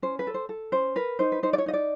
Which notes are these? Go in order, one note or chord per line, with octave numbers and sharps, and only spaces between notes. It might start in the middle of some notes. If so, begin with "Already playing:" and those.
C#4 C5
B4
A4
C5
A4
C#4 C5
A#4 B4
D#4 C5
B4
D#4 C5
D5
C#5
D#4 D#5
D5